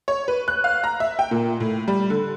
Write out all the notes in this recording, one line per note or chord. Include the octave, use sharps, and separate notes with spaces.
C#5
B4
F#6
F5
A#5
E5
G5
A#2
A2
G3
D3